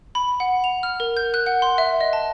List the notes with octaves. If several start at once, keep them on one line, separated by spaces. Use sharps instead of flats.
B5
F#5
F7
F6
A#4
G6
F#6
F#5
C6
E5
D#5
A5